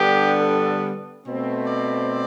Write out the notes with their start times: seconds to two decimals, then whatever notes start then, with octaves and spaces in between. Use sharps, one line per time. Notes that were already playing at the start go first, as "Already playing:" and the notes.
Already playing: D3 G3 B3 D4 G4
0.41 A4
1.25 B2 A3 C4
1.66 D5